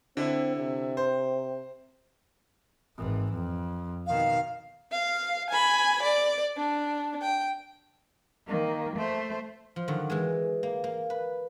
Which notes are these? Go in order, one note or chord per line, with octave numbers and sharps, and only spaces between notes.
D3 C4 E4
C3
C5
G#1 E3
F2
B2 D#3 F5
F5
G#5 B5
D5
D4
G5
D#3 A#3
A3 C5
F3
D3 D#3 F#3
E3 G#3
A#3
A#3
B4